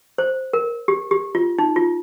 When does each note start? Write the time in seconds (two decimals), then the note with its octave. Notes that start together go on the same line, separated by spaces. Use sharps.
0.18 C5
0.53 A#4
0.88 G4
1.11 G4
1.35 F4
1.58 D#4
1.76 F4